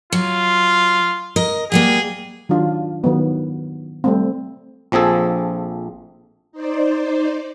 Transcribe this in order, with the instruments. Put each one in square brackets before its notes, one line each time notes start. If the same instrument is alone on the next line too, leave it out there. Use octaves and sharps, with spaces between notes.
[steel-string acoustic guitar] F#3 [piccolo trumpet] F4
[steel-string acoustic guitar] A#4 D#5
[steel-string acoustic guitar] F#3 G3 A#3 [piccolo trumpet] G#4
[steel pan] D#3 F#3 D4 F4
D#3 F#3 B3
G3 A3 C4
[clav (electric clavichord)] A#1 F3 C4 G#4 A4
[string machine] D#4 C5 D5